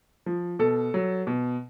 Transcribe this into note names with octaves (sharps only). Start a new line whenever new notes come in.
F3
B2 A4
F#3
B2